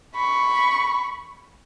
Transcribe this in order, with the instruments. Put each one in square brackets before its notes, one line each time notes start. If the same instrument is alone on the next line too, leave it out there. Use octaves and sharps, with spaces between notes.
[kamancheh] B5 C#6